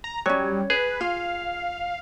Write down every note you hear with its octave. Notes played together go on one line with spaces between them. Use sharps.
A#5
F#3 G3 C#4 C#5
G#4 B4
F4 F5